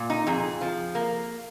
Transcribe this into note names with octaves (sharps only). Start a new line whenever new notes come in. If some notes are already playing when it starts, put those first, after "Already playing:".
Already playing: A#2
D#4
F2 G#4
F3
A#3